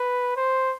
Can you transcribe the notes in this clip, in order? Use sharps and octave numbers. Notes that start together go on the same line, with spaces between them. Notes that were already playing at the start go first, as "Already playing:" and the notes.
Already playing: B4
C5